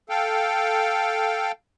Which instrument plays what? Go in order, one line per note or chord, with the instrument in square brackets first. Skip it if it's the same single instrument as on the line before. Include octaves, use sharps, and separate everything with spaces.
[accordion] A4 F5 G5